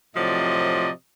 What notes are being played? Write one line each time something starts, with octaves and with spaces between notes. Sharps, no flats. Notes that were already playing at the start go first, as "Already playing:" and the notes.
A2 C3 F3 F#3 D5 D#5